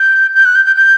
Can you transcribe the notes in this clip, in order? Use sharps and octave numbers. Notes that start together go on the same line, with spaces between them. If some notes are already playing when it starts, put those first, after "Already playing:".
Already playing: G6
G6
F#6
G6
G6
G6